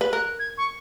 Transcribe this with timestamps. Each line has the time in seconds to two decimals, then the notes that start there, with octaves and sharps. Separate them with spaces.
0.01 B4
0.12 A#4 F#6
0.39 G#6
0.58 C#6